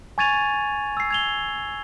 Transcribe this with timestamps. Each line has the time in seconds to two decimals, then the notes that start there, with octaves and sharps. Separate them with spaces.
0.18 G#5 C#6 G#6 A6 D#7 F7
0.97 E6 C7
1.11 G#6 F7 G7